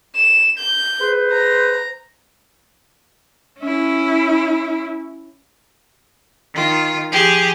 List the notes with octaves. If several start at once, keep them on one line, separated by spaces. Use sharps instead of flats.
E7
G6
G#4 B4 C5
A#5
C#4 E4
D#3 F4
F3 G4 G#4